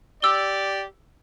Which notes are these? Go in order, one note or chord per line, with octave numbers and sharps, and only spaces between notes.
G4 D5 E6 G7